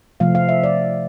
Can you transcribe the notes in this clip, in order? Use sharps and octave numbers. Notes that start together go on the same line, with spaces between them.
C3 F3 A3 F5
F5
E5
D5